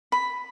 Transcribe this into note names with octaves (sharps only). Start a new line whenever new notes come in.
B5